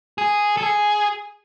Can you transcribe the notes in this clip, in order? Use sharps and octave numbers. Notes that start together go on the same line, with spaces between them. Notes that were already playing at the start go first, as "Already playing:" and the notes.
G#4
A4
G#4